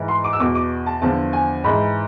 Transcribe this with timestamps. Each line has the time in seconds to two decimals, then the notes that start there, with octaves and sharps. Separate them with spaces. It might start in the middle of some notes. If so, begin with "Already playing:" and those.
Already playing: G#2 E3
0.08 C6
0.24 D6
0.33 E6
0.40 E2 B2 D6
0.55 D6
0.86 A5
1.02 E2 D3 F3 A5
1.33 G#5
1.64 G#2 E3 B5